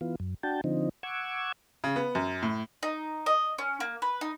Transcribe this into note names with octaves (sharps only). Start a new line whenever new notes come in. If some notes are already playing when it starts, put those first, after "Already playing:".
E3 B3 F4
F#2
D4 F#4 G5 A5
D3 F3 C4 D#4
F#5 C#6 D6 E6 G#6
C#3
B3
F#2
A2
D#4
D#5
C#4
A#3
B4
D#4